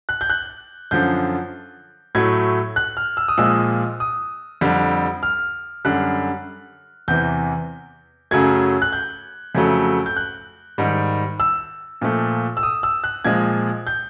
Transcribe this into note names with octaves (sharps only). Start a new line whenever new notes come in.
F#6
G6
F#6
F#2 D3 F3 G6
A2 F#3 A3 G#6
F#6
F6
E6
D#6
A#2 F3 G#3 E6
D#6
F2 D3 G3
F6
F#2 D3 G3 F#6
E2 C3 E3 G6
F#2 C#3 F#3 A3 G#6
F#6
G6
F2 C#3 F#3 A3
G6
F#6
G#2 D#3 G3
E6
A#2 F3 A3
E6
D#6
E6
F#6
A#2 F3 G#3 G#6
G6